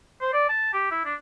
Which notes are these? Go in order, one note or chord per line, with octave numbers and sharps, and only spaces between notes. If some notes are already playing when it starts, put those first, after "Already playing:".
C5
D5
A5
G4
E4
D4